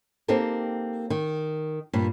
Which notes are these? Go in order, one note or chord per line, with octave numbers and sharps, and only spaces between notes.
A#3 C4 D#4 G4 A4 A#4
D#3
G2 A#2